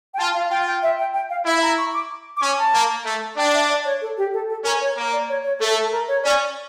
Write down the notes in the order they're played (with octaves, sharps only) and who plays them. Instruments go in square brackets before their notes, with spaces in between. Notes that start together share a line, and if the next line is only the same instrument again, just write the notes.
[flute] G5
[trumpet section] F4 [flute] A5
[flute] F5
[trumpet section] F4 [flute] G5
[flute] G5
E5
G5
G5
F5
[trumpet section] E4 [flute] E5
[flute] A#5
C#6
D6
D6
[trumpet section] C#4 [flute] C#6
[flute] A5
[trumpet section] A#3
A3
[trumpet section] D4 [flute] G5
[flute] E5
D5
C#5
A4
G4
A4
A4
[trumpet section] C#4 [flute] A#4
[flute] C#5
[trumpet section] A#3
[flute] D5
C#5
C#5
[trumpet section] A3 [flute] A4
[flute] A4
A4
A#4
C#5
[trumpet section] C#4 [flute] D5